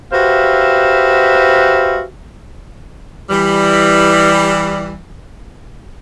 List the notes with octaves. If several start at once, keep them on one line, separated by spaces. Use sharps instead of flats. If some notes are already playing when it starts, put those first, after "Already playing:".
F#4 G4 B4 C5 E5 F5
E3 G3